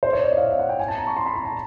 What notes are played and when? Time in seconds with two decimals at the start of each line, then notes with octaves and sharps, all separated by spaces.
0.03 C5
0.13 C#5
0.22 D5
0.32 D#5
0.37 F5
0.42 E5
0.51 F5
0.59 F#5
0.69 G5
0.79 G#5
0.88 A5
0.98 A#5
1.07 C#6
1.17 C6
1.26 B5
1.36 A#5
1.45 A5